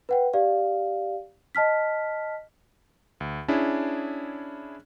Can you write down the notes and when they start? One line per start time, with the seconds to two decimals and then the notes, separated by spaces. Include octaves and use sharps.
0.09 B4 F#5 G5
0.33 G4 D5 F5
1.55 D#5 A5 F6 B6
3.20 D2
3.48 C#4 D4 E4 G#4